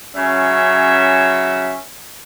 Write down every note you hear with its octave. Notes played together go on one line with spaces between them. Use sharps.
C#3 F#3 C#4 E5